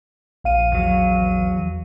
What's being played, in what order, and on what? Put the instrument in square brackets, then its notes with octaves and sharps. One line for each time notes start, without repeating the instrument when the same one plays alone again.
[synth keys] A#1 F5 D#7
[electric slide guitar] E2 F#3